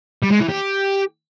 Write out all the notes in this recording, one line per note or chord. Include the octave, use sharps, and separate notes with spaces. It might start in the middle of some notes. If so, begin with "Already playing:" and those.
G3
G#3
E3
G4